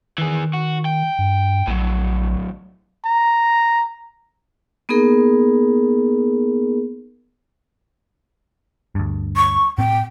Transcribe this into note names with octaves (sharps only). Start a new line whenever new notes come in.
D#3 E3 G#4
F#4
G5
G2
A#1 A2 F#3
A#5
A#3 B3 D#4 G#4 A#4
D2 G2
C#6
A2 C4 G5